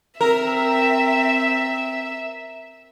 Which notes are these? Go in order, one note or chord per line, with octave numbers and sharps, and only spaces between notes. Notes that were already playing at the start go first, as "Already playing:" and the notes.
C4 A#4 E5